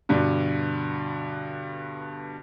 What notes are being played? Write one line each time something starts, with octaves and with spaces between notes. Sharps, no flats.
G2 B2 D3